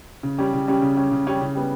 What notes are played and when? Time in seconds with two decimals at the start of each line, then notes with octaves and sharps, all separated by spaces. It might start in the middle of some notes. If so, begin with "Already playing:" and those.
0.23 C#3
0.39 G3 C#4 G4
0.53 C#3
0.68 G3 C#4 G4
0.82 C#3
0.96 G3 C#4 G4
1.11 C#3
1.27 G3 C#4 G4
1.41 C#3
1.55 G3 B3